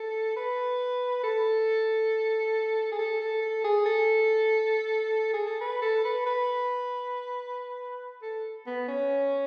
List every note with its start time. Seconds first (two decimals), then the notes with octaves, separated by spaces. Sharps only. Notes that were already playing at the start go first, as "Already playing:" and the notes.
Already playing: A4
0.37 B4
1.24 A4
2.92 G#4
2.99 A4
3.21 A4
3.42 A4
3.65 G#4
3.86 A4
5.34 G#4
5.47 A4
5.61 B4
5.82 A4
6.05 B4
6.26 B4
8.23 A4
8.67 B3
8.88 C#4